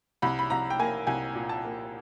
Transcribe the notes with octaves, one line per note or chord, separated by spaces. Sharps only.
C2 B5
B5
C2 A#5
G5
A#3 G#5
C2 G#5
A#2
A5
A#3